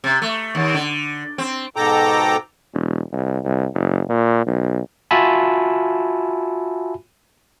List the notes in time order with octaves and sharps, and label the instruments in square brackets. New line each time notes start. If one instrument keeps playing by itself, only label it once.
[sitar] C3
A3
D#2
D3
C4
[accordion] G#2 B2 A4 G5 A#5 D6
[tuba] E1
C2
C2
F#1
A#2
B1
[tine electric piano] F4 F#4 E5 G#5 A5 B5